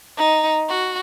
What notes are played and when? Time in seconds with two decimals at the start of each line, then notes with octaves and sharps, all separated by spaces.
0.16 D#4
0.68 F#4